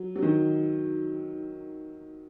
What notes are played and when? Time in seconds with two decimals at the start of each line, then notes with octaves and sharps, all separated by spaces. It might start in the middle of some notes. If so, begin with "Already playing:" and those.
Already playing: F#3
0.16 F#3
0.22 D#3